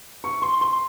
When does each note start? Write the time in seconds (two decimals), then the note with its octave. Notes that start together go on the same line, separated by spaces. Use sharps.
0.24 C#6
0.42 C6
0.61 C6